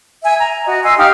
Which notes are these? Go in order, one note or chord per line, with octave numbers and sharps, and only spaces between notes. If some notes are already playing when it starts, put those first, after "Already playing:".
E5 G#5
A#5
F#4 D#5
D#5 G#5 C6 E6
D#4 G4 F5 F6